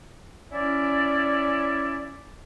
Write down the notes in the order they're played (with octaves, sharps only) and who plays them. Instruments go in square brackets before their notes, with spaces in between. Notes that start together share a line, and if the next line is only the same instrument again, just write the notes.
[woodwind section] C#4 E4 D5